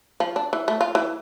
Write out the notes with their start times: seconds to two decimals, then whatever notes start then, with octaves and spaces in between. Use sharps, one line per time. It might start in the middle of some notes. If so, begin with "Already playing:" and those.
0.20 F3
0.36 D4
0.53 E3
0.68 A3
0.81 F4
0.95 E3